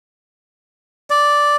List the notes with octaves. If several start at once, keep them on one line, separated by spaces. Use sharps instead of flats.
D5